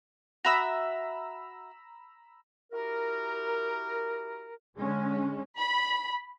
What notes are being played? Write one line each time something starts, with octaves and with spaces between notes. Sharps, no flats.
F#4 E5 A#5 B5 D#6 E6
E4 F#4 G4 A#4
D3 G#3 C#4
B5